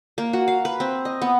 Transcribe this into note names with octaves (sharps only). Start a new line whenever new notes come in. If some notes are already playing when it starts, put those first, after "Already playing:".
A#3
F#4
F5
B4
C4
D#5
B3